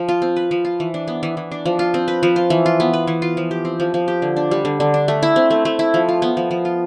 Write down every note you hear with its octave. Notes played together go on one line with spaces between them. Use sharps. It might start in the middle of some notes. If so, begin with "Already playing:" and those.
Already playing: F3
F4
C4
B4
F3
F4
E3
D4
B3
E3
E3
D4
F3
F4
C4
B4
F3
F4
E3
F4
B3
B4
E3
F4
F3
G4
C4
F3
F3
G4
D3
D4
G3
D3
D3
D4
A3
E4
C4
A3
A3
E4
F3
F4
B3
F3
F3
F4